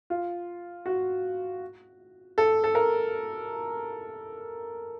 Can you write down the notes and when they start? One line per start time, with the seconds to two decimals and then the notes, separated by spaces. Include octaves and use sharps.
0.10 F4
0.86 F#4
2.38 A4
2.64 A4
2.75 A#4